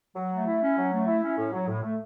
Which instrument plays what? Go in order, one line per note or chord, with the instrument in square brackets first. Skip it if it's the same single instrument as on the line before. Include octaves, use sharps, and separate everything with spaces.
[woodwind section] F#3
A3
E4
C#4
F#3
A3
E4
C#4
A2
F#3
A2
A3